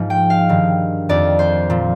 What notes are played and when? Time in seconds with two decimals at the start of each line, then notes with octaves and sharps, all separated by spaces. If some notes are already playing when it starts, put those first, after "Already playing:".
Already playing: G#2 F3
0.10 G5
0.30 F5
0.49 G2 D#3
1.09 F2 D#3 D5
1.39 C5
1.70 A#2 F3